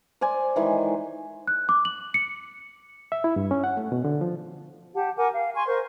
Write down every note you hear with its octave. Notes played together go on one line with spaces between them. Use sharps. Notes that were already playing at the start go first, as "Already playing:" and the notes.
C5 D5 G#5
D#3 E3 G#3
F#6
D6
F#7
C#7
E5
E4
G2
C#4
F#5
A3
B2
D3
F3
G4 F#5 A5
A#4 F#5 G#5 D6
F5
G#5 C6 C#6
A#4 C5 C#6